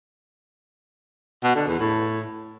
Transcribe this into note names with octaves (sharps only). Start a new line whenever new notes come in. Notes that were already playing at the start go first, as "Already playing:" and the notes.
B2
D3
E2
A2